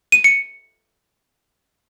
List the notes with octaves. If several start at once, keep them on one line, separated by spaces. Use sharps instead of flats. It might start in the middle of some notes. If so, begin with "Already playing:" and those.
D#7
C#7